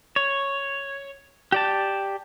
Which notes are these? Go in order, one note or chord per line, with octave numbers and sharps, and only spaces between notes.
C#5
G4 D5 A5